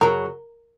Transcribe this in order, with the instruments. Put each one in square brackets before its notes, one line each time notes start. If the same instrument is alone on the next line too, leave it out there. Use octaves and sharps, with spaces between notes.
[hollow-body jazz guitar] F#2 C#3 F#3 [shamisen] A#4